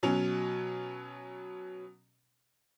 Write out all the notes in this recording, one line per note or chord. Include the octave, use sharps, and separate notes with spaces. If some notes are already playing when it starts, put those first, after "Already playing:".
B2 F#3 C#4 F7